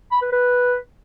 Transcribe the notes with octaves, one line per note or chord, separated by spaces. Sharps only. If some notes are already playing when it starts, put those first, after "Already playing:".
B5
B4
B4